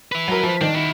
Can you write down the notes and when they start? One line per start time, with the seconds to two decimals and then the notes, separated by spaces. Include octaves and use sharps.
0.12 B4 E5
0.28 F#3 A#4
0.43 F3
0.61 D#3 D4
0.76 E4 F#4